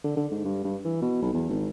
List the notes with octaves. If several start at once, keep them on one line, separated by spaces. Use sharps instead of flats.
D3
D3
G#2
G2
G2
E3
B2
B1
E2
G#1